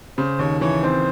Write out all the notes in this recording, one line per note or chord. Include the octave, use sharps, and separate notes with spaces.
C#3 C5
D#2 C#5
E3 C#5
C4 C5